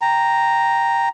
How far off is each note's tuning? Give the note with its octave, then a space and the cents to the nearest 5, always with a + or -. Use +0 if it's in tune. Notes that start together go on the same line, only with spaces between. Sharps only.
G5 +0 A#5 +0